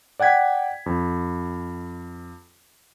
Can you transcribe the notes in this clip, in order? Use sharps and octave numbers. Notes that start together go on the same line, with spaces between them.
D5 F#5 G5 G#6 B6
F2